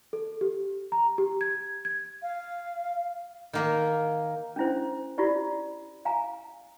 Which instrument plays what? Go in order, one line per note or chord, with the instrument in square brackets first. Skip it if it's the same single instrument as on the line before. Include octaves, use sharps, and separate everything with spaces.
[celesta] A4
G4
A#5
G4
G#6
G#6
[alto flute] F5
[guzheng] D#3 A#3 E5
[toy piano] C#4 D4 E4 C5
E4 F4 G4 D5
F5 G#5 A#5